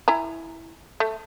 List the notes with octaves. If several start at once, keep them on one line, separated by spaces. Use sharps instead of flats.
E4 G#5 A#5
A3